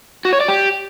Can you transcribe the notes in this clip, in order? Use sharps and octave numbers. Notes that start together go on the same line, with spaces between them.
F#4
C#5
D5
G4